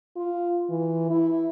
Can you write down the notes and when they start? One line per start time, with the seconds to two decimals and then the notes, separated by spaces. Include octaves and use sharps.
0.16 F4
0.70 E3
1.10 E4